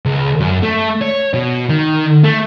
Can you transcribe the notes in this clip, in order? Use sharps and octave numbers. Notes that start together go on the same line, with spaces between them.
C#2
F#2
A3
C#5
B2
D#3
A3